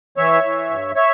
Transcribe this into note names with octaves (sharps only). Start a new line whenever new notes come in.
E3 C#5 E5
E3
G2
C#5 E5